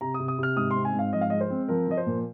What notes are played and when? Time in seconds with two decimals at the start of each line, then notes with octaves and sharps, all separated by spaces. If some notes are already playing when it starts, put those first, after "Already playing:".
0.01 C3 A#5
0.14 D#6
0.19 C3
0.28 D#6
0.38 C3 F6
0.56 G#2 D#6
0.71 C6
0.76 C4
0.85 G#5
0.94 G#2
0.99 F5
1.13 F3 D#5
1.21 F5
1.30 G#3 D#5
1.41 C5
1.50 C4
1.68 F3 A#4
1.87 F3 D#5
1.97 C5
2.06 A#2